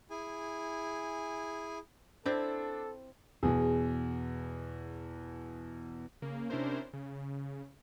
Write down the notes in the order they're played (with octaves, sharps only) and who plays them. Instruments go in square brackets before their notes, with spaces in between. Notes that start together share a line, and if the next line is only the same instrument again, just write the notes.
[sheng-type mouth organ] E4 G#4 G#5
[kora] C4 E4 C5 [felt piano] D4 [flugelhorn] A4
[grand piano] E2 B2 [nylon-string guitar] G#4
[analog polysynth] C#3 A#3
C3 C#4 D4 E4 A#4 C5
C#3